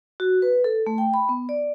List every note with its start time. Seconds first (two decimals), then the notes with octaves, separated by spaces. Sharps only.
0.20 F#4
0.42 B4
0.64 A4
0.87 A3
0.98 G5
1.14 B5
1.29 B3
1.49 D5